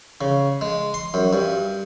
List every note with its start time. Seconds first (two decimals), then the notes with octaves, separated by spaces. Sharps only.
0.21 C#3
0.61 G#3
0.94 C6
1.14 F#2
1.33 G2